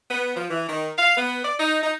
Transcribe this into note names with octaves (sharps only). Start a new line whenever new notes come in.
B3
F3
E3
D#3
F5
B3
D5
D#4
D#4